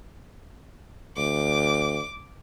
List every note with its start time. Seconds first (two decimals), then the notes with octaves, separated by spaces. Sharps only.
1.17 D2 D6